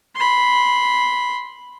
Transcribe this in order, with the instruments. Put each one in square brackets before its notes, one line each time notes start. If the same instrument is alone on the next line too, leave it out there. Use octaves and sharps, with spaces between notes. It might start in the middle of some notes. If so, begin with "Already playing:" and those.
[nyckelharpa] B5 C6